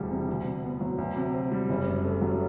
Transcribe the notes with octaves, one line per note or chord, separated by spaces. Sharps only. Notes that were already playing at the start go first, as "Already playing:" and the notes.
Already playing: E1 D2 G3
C3
D2
C3
B3
F#3
D2
C3
C4
G3
F#1
F#2
A3
F#3